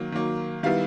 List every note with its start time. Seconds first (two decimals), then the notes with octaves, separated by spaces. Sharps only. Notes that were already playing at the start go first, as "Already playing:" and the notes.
Already playing: D#3 F#3 A#3
0.12 D#3 F#3 A#3
0.63 D#3 G3 B3 E4 F5